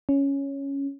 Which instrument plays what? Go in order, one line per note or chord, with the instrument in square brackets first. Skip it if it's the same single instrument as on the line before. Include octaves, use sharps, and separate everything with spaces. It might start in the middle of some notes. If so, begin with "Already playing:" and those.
[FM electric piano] C#4